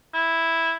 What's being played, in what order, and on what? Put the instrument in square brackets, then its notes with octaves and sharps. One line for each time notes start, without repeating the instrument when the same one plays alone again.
[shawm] E4